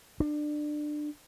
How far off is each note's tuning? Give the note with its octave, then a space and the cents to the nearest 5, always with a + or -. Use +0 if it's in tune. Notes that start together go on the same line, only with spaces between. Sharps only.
D4 +25